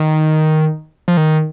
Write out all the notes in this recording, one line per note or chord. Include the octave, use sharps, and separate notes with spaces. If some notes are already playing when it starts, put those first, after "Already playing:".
Already playing: D#3
F3
D#3